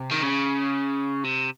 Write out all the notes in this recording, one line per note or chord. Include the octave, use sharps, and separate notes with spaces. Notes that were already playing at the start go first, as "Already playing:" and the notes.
Already playing: C3
D#3
C#3
C3